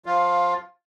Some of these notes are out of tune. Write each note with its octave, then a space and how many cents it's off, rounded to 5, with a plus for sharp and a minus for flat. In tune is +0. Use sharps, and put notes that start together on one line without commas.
F3 +10 F4 +10 F5 +0